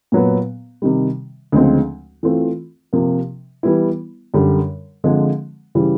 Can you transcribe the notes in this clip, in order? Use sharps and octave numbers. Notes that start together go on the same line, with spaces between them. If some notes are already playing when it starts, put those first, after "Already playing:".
A#2 F#3 B3
C3 D#3 G3
D2 C#3 F3 G#3 C4
E3 A3 C4 F4
C3 F3 A#3
E3 G3 B3 E4
F#2 D3 G3
D3 F3 G#3 C4
C#3 E3 G3